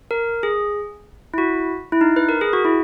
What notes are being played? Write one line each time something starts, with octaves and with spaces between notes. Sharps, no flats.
A#4
G#4
E4
F#4
E4
D#4
B4
A#4
G#4
F#4
E4